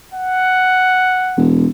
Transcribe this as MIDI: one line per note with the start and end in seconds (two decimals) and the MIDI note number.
0.14 1.49 78
1.37 1.67 28